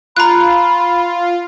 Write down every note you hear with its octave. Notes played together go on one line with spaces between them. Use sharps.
F4 A#5 B5 F#6